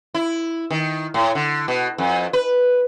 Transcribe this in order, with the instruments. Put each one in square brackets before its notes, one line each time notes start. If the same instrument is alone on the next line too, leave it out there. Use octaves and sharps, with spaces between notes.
[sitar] E4
D#3
A2
D3
B2
F2
B4